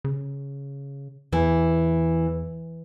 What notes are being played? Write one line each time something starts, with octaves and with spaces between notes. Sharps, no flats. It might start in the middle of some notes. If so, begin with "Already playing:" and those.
C#3
E2 E3